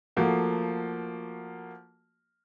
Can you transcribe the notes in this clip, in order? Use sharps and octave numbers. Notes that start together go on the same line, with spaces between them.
F3 A3 A#3 F#4